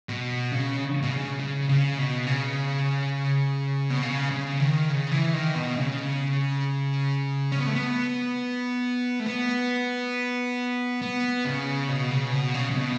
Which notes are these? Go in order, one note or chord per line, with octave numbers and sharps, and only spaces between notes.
B2
C#3
B2
C#3
C#3
C#3
B2
C#3
B2
C#3
C#3
D#3
C#3
E3
D#3
B2
C#3
C#4
B3
A3
B3
A3
B3
B3
C#3
B2
C#3
B2
C#3
C#3
B2